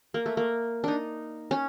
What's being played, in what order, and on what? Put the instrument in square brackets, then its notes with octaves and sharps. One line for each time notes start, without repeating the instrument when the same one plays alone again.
[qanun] A#3
A3
A#3
D4 D#4
C#4